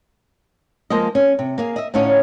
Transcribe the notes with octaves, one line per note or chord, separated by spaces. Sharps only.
F3 G#3 A#3 D#5
C#4
C3
A#3 G#4 F5
D#5 E5
A2 D3 C#4 D#4 C#5 F5